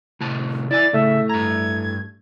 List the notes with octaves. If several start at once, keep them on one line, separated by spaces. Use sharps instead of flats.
A2 C3 A5
E4 D5 E5 G#5 A6
A2 C#3 A3 E5
G2 A#5 G#6